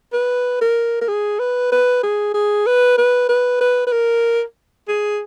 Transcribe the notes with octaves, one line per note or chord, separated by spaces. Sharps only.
B4
A#4
A#4
G#4
B4
B4
G#4
G#4
B4
B4
B4
B4
B4
A#4
G#4